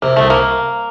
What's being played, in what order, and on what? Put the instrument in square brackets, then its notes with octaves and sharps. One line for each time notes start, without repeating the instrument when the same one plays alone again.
[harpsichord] C3 [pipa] A#3
[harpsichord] C2 [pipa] A3
[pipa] A#3